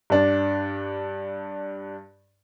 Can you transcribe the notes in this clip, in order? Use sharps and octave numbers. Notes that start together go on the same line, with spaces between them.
G2 D4